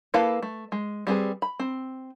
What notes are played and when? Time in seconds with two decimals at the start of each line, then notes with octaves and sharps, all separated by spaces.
0.14 A#3 E4 A4 B4 F5
0.42 A3
0.72 G#3
1.07 G3 C4 G#4 B4
1.42 B5
1.59 C4